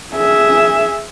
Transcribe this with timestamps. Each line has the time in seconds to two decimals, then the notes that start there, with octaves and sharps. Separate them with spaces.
0.15 G#4 E5